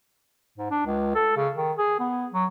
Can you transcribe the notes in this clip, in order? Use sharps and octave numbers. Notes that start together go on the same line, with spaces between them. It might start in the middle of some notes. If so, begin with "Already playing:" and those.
G#2
D4
C#2
A4
C#3
D#3
G#4
B3
F#3